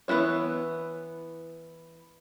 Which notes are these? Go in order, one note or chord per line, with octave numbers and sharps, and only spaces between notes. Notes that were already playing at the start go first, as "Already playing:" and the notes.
E3 B3 E4 F#4 C#5